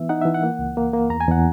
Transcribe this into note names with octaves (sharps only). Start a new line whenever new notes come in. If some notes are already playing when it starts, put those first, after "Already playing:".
Already playing: E3 B3 E5
D#4 F#5
E3 E5
F#5
A#3
C#2
A#3
A#3
E2 A#5
G#5
E2 F#5